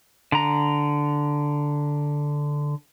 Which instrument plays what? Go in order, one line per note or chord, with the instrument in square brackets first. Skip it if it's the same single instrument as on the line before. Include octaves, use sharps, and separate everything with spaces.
[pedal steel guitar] D3 A#5